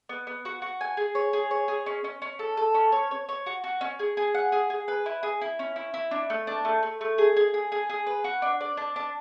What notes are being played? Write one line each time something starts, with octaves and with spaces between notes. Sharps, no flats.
B3
B3
F#4
F#4
G#5
G#4
C#5
G#4
C#5
G#4
C#4
C#4
C#4
A4
A4
C#4
C#5
C#5
C#5
F#4
F#4
C#4
G#4
G#4
F#5
G#4
G#4
B4
E4
G#4
E4
C#4
E4
E4
D4
A3
D4
A3
A3
A3
G#4
G#4
G#4
G#4
G#4
B4
F#4
D4
D5
D4
D4